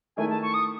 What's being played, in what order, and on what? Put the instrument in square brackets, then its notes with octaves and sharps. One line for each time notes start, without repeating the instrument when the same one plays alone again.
[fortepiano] D#3 A3 E4 G#4 [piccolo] G#5
[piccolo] A5
C#6
D#6